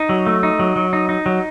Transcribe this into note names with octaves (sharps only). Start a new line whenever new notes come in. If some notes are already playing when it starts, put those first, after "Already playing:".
Already playing: D#4
F#3
A3
D#4
F#3
F#3
D#4
D#4
F#3